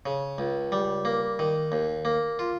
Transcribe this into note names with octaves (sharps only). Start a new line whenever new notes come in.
C#3
C#2
G3
A#3
D#3
D#2
A#3
F4